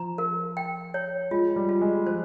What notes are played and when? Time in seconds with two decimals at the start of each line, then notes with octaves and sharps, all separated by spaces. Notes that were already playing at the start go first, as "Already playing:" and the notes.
Already playing: F3 A#5
0.18 A#4
0.57 G5
0.94 C#5
1.31 G#3 F4
1.56 G3
1.69 F4
1.82 G#3
2.06 F3 C5